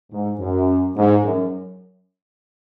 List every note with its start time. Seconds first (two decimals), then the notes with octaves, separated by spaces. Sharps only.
0.12 G#2
0.40 F#2
0.96 G#2
1.24 F#2